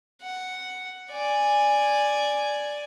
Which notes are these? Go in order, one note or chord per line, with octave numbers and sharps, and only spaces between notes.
F#5
D5 G#5